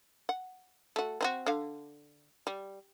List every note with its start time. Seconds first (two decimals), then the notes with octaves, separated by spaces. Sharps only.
0.29 F#5
0.96 A3 F#4
1.21 C4 D#4 F#4
1.46 D3 F5
2.47 G3